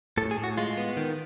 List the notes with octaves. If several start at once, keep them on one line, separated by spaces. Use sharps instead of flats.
A2 A4
G#4
A2
F#4
G#3 F4
B3
D#3